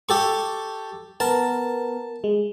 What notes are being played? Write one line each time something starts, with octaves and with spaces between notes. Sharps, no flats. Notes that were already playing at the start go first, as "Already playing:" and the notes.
G4 A4 C#6
B3 A#4 A5
G#3